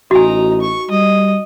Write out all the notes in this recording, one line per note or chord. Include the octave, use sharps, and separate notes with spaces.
A1 D#4 F#4 G#5 A#5
C#6
G3 D#5